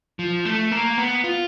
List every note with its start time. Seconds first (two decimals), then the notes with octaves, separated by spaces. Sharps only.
0.19 F3
0.45 A3
0.72 A#3
0.98 B3
1.24 F4